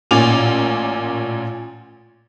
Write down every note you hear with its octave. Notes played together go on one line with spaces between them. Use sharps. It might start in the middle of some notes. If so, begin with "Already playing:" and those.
A1 A#2 C#4 D6 F7